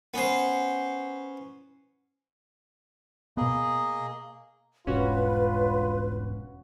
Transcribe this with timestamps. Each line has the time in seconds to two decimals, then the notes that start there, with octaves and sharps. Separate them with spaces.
0.14 B3 C#4 C5
3.37 B2 A#3 B3 G#4 D#5
4.87 E1 C2 G#2 C#4 F4 F#4 B4